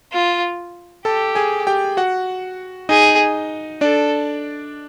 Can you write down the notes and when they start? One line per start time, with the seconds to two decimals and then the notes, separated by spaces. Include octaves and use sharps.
0.12 F4
1.05 G4 A4 A5
1.35 G#4 G#5
1.67 G4 G5
1.97 F#4 F#5
2.89 D#4 G#4 D#5
3.81 D4 A4 D5